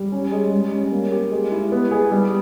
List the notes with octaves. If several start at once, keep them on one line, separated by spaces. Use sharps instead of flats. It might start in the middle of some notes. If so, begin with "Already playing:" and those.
Already playing: G3
C#4
G#3
G3
C#4
A#3
G4
G#3
E4
B3
G#4
G3